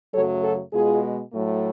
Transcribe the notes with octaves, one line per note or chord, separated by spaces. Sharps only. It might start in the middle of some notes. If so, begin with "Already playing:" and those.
F#2 C#3 F#3 A3 A4 C#5
F#4 A4
B2 G#3 F4 G#4
A2 F#3 A3